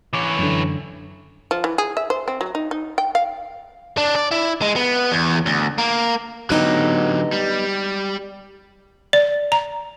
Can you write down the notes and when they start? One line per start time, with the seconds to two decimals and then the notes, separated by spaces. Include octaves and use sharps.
0.13 E3 C#5 D6
0.38 F#2 D3
1.51 F3
1.64 E3
1.78 G#4
1.97 E5
2.10 C5
2.28 C4
2.41 F#3
2.55 D#4
2.71 D#4
2.98 G5
3.15 F5
3.97 D4
4.16 D5
4.31 E4
4.62 G#3
4.76 B3
5.12 E2
5.46 D2
5.78 A#3
6.50 D3 F#3 B3 D#4 G4
7.32 G3
9.13 D5
9.52 A#5